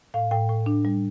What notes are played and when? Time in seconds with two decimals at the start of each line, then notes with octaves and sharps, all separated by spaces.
0.14 A2 F5
0.31 A2 G5
0.49 A2
0.66 D4
0.85 G3